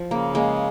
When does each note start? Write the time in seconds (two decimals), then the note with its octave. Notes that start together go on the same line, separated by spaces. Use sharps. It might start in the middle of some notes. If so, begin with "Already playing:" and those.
Already playing: F3
0.11 C#3 A#3
0.35 G#3 A#3